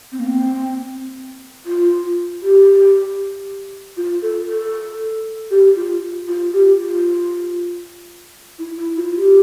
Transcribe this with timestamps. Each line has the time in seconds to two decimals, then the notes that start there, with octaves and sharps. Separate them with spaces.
0.12 C4
0.19 A#3
0.27 C4
1.66 F4
2.42 G4
3.97 F4
4.22 A4
4.48 A4
5.51 G4
5.76 F4
6.28 F4
6.53 G4
6.79 F4
8.58 E4
8.78 E4
8.97 F4
9.16 G4